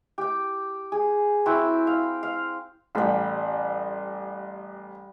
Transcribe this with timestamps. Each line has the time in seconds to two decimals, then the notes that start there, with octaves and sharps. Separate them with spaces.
0.18 G4 G5
0.92 G#4
1.46 C4 E4 F#4 G5
1.87 F5
2.23 F5
2.95 A1 G3 B5